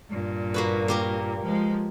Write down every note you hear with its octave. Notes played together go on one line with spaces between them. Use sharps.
G2 A#2
A#3 F#4 B4
A#3 G4 A#4
F3 G#3